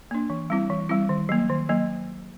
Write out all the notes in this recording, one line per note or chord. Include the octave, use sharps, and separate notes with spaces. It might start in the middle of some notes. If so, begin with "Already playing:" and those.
A#3 D4
E3
G3 C4 E4
E3
G3 C4 E4
D#3
F#3 A#3
D#3
F#3 A#3